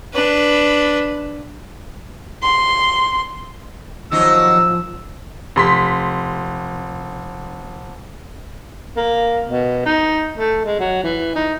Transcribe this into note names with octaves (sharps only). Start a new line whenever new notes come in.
D4 B4
C6
D#2 F3 F#3 D#4 E6
F1 C6 B6
A#3
B2
D#4
A3
G#3
F#3
E3
D#4